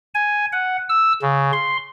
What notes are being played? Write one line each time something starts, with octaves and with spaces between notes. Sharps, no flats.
G#5
F#5
E6
C#3
C6